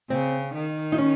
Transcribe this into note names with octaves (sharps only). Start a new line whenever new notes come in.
C#3 C4
D#3
D#4
C#4